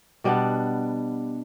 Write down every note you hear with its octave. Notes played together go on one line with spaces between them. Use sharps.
B2 G3 B3 D4